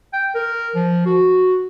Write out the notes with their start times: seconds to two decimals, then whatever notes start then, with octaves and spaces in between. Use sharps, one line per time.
0.13 G5
0.35 A#4
0.75 F3
1.06 F#4